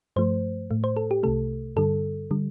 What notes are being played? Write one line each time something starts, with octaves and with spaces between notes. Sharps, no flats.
G2 F3 A3 C5
A2 A3
C5
A4
G4
C2 C3 A3 A4
G2 D3 G3 A4
D3 G3